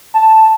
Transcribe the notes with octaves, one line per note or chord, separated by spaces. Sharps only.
A5